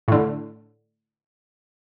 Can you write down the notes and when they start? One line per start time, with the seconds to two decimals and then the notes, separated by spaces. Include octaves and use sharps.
0.08 A2 D3